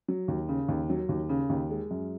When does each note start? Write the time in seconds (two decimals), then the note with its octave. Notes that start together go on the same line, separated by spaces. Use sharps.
0.08 F#3
0.28 D#2
0.49 C#3
0.68 D#2
0.90 F#3
1.09 D#2
1.29 C#3
1.50 D#2
1.70 G#3
1.91 F#2